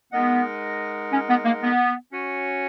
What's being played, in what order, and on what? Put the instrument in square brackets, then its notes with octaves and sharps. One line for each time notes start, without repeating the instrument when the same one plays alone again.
[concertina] G#3 D#4 A#4 D#5 F#5 [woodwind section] B3
[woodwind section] C#4
B3
A#3
B3
[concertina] C#4 F#4 C#5 G#5